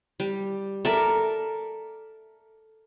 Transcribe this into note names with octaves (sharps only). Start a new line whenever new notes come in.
G3
A4 A#4 D5 E5